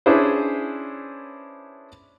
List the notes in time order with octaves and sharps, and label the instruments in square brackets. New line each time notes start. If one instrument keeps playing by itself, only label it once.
[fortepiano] C#4 D4 E4 G#4 B4 C5